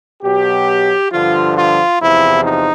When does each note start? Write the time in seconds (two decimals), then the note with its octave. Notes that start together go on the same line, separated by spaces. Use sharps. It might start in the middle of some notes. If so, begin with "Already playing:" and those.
0.23 B2 F#3 G4
1.12 G2 D3 F3 F4
1.56 F4
2.00 E2 C3 F3 E4
2.44 D#4